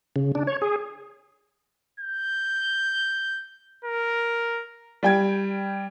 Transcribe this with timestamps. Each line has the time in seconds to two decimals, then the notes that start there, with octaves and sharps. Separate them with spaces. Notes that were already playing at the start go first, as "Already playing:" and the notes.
0.16 C#3
0.35 D4
0.47 C#5
0.62 G#4
2.00 G6
3.85 A#4
5.03 G3 G5 G#6